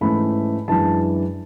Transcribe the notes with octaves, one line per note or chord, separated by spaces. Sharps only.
G#2 E3 A3 C#4 B5
F#2 E3 G#3 D4 A5